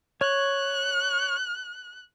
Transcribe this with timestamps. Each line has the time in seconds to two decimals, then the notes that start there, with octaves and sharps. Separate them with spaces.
0.21 C#5 F#6